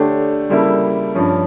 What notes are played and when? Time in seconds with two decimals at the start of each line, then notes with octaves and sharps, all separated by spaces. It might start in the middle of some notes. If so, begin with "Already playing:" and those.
Already playing: D3 A3 D4 G4 C#5
0.49 C#3 G3 A#3 E4 A4
1.15 G2 F3 C#4